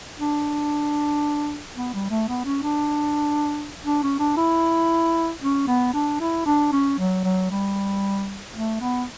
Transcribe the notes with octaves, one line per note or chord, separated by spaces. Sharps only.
D4
B3
G3
A3
B3
C#4
D4
D4
C#4
D4
E4
C#4
B3
D4
E4
D4
C#4
F#3
F#3
G3
A3
B3